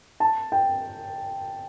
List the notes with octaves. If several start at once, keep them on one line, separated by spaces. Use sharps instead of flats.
A5
G5